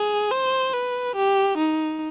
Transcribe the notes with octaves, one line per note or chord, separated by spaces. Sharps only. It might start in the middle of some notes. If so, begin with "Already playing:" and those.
Already playing: G#4
C5
B4
G4
D#4